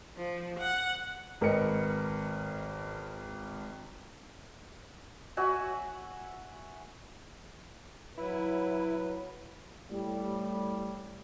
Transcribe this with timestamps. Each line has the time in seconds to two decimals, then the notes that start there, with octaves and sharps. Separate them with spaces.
0.17 F3
0.59 F#5
1.41 G#1 A#4 B4 D#5 C#7
5.37 F#4 E5 F#5 G#5
8.18 F#3 E4 B4
9.91 A2 G3